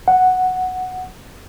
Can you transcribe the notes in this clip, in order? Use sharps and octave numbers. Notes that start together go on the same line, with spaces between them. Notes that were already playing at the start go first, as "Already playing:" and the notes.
F#5